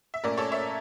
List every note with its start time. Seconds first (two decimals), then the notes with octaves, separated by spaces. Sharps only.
0.14 E5
0.24 A#2 A3 C#4 A#4 D5
0.38 A4 C#5
0.52 C#5 E5